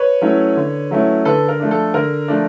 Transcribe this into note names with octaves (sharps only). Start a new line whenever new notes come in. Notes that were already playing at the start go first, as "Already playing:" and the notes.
Already playing: B4 C#5
F#3 A3 C#4 E4
D3
F#3 A3 C#4 E4
D3 A4 B4
A#4
F3 A3 D4
A4
D3 A#4
F3 A3 D4